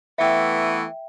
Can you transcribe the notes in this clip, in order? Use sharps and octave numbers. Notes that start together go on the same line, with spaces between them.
E3 A3 B3 E5 G5